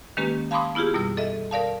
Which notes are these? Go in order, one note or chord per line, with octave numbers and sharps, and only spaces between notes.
D#3 G#3 A#3 C#4 G4 B4
F5 A5 B5 C6 D6 D#6
B3 E4 F4 G4 G#4
F#2 B2 G3 E6
A4 D#5 E5
A#4 D5 F5 A5